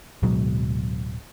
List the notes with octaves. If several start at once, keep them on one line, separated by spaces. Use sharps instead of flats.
D1 B2 F#3 G#3